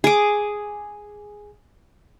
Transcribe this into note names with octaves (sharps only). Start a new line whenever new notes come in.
G#4 D6